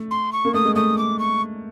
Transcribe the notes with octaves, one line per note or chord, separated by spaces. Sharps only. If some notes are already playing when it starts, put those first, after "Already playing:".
Already playing: A3
C6
C#6
A#3
A3 D#6
G#3
A3 D#6
D6
C#6